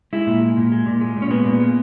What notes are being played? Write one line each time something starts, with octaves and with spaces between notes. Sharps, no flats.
G#3 E4
A#2
G#3
A#2
G#3
A#2
G#3
A#2
C#4
G#3 B3
A#2
G#3